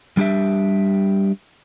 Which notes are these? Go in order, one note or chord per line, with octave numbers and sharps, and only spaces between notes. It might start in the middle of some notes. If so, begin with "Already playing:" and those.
G3 D4 G4 E5